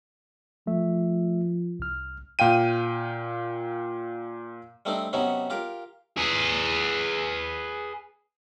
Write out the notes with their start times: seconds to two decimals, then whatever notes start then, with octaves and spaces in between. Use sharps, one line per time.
0.67 F3 A3 E5
1.80 C2 F6
2.39 A#2 F5 G5 D#7
4.85 G3 A3 C4 D4 D#4
5.13 C3 F#3 B3 C#4 D#4
5.50 F4 G4 A#4
6.17 G#4 B4